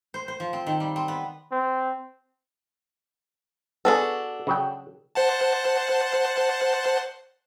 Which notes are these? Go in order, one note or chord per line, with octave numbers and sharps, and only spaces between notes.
C5
C5
F3
C4
D#3
G3
C4
B3
C4
B3 D4 F#4 G#4 A4
C#3 F#3 G5
C5 F#5 A5